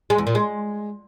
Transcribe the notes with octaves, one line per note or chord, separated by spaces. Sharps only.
G#3
E2
A#2
G#3